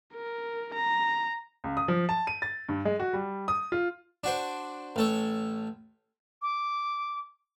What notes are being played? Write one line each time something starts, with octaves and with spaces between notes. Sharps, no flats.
A#4
A#5
C#2
D#6
F3
A5
D#7
A6
G2
G#3
F#4
G3
D#6
F4
D4 F#4 C5
A1 A4 C#5
D6